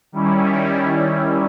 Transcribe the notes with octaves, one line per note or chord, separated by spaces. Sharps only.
D#3 G3 C#4 E4